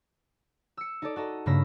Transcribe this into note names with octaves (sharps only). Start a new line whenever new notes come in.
E6 C#7
D#4 A4 D5
F#4 A4 D#5 A#5
G2 C#3 A#3 B5 E6 A#6